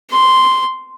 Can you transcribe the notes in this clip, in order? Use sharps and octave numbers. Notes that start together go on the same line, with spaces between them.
C6